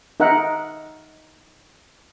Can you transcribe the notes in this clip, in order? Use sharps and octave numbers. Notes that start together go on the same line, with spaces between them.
D#4 A#4 E5 F#5